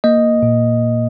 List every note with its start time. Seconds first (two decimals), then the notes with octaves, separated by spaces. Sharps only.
0.04 A#3 D#5
0.43 A#2